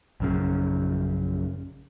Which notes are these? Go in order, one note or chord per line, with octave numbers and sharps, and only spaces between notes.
A#1 F#2 C#3